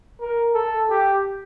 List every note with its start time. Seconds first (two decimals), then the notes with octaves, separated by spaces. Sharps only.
0.21 A#4
0.55 A4
0.90 G4